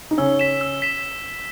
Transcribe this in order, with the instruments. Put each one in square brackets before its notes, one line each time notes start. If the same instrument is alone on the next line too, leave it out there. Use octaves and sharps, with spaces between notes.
[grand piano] D#4
[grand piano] C#3 C#4 [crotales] E6
[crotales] B6 E7
E6
B6 E7